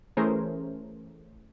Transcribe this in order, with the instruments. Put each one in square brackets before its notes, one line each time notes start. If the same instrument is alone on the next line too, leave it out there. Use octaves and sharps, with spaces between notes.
[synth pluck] E3 A3 C#4 G#4 A#4 C5